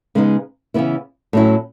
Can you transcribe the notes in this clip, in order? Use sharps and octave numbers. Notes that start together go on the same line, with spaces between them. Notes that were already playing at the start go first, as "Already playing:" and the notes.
C#3 G#3 B3 D#4
C#3 E3 B3 E4
A2 F#3 C#4 E4